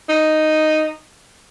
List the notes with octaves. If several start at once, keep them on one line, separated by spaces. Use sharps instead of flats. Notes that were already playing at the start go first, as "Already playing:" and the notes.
D#4